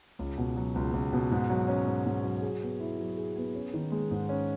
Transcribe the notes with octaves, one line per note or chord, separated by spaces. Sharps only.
C#2
B2
F#3
C#2
C#2
B2
G#2
F#3
C#4
G#2
G#2
F#3
G#4
B3
E4
F#3
G#4
B3
C#4
D#3
G#3
G#2
C#4